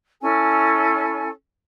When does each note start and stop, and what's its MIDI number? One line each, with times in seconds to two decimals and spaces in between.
0.21 1.28 61
0.21 1.28 64
0.21 1.28 69
0.21 1.28 80